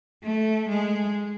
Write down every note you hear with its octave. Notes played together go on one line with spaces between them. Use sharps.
A3
G#3